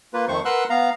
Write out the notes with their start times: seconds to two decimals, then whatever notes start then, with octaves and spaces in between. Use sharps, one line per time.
0.14 A#3 F4 B4
0.28 F2 D#3 A3 C5 C#6
0.45 A#4 B4 F#5 C6 E6 F#6
0.70 B3 F5 A#5